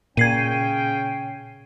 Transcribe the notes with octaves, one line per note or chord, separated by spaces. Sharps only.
A#2 C#3 C#4 G5 G#6 C7 D#7